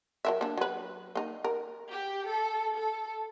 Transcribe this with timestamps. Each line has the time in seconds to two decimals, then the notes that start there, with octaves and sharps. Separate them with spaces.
0.25 F#3 A#4 E5
0.41 A#3 D4
0.57 F#3 B4
1.15 A#3 D#4
1.44 A#4
1.89 G4
2.27 A4
2.76 A4